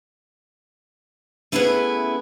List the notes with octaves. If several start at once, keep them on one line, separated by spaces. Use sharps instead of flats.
A3 B3 C#4 E4 G#4 B4